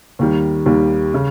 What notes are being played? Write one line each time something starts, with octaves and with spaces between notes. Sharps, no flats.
D#2 D#3 G3
D#2 D#3 G3
C#3